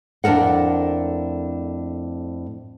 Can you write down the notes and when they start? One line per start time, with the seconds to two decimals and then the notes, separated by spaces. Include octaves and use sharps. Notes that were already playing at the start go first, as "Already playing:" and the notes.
0.24 F2 A2 D4 A#4 F#5